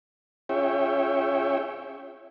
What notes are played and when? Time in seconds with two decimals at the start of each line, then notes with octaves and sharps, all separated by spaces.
0.49 C#4 F4 G#4 C#5 E5 G5